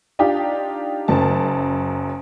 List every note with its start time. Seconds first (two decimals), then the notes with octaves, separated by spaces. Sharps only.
0.19 D4 D#4 F4 G4
1.08 F#1 F#2 A5